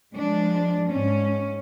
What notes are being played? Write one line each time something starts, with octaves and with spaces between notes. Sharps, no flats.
F3 G#3 D4
G#2 C#4